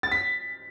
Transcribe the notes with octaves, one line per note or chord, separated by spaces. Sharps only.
A6
B6